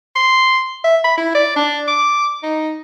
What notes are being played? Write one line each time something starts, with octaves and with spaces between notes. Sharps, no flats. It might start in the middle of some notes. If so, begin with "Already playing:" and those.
C6
E5
B5
E4
D5
D4
D6
D#4